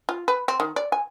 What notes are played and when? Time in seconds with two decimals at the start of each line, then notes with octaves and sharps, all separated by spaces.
0.09 F4
0.28 B4
0.48 C4
0.60 D#3
0.76 D5
0.92 G#5